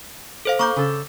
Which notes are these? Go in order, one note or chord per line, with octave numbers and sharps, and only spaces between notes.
A4 C5 F5
A#3 C#6 D6 G6
C#3 A4